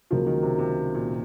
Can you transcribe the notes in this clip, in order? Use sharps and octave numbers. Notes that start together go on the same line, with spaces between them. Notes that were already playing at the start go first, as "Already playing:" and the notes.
C#2 C#3 F3 F#3 A#3 F4
D#3
C3
C3
A#2